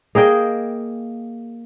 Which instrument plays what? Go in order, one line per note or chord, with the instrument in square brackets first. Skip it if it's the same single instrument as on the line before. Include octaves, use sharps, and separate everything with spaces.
[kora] A#3 G#4 D#5 G5